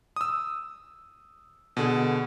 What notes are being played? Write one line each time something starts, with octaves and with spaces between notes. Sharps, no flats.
D#6 E6
B2 D3 G#4